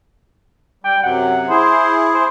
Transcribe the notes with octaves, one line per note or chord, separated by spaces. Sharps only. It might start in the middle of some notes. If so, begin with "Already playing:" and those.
G3 G5
F#2 C3 F#3 F#5
E4 G#4 C5
C5